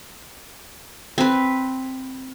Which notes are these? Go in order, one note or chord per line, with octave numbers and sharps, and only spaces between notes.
C4 B4